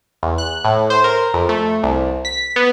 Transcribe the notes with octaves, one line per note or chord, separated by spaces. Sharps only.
E2
F#6
A2
C5
A#4
F2
A3
C2
B6
B3